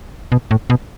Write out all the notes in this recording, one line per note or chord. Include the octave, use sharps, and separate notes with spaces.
B2
A2
B2